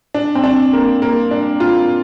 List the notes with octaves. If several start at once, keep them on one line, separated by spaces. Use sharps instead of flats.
D4
C4
D4
A#3
A#3
D4
F4